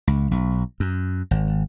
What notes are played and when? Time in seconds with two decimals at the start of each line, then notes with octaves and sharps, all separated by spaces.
0.07 C#2
0.31 B1
0.80 F#2
1.31 G#1